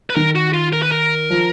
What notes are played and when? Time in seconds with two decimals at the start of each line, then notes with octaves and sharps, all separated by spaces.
0.10 B4
0.16 D#3 A#4
0.35 F#4
0.54 F4
0.73 A#4
0.82 B4
0.92 A#4
1.30 F3